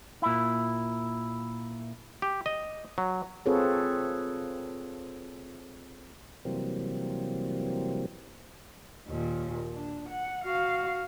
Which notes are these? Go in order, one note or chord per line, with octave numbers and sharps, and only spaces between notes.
A#2 E4
G4
D#5
F#3
C4 F4 G#4 A4 B4 C#5
C3 E3 F#3 G3 A#3 C4
D#2 A#2
D4
F#5
F#4 F5